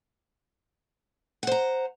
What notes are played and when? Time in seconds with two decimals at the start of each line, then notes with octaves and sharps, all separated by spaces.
1.43 F#5
1.47 C5
1.52 A#5